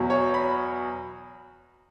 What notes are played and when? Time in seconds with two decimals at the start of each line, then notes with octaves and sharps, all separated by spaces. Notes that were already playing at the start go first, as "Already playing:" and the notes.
Already playing: E2 B2 F#3
0.10 C#5
0.34 B5